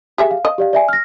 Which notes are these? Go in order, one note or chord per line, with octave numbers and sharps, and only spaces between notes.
G4 G#4 E5
F5
D#5
G4 D5 F5
D5 E5 G#5
F6 A#6